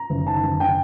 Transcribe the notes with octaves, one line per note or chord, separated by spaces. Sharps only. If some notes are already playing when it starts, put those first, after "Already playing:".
Already playing: A#5
F#1
D#3 A5
F#1
D3 G5